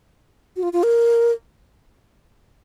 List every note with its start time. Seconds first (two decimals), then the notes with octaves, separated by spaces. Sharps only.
0.56 F#4
0.63 F4
0.73 F4
0.83 A#4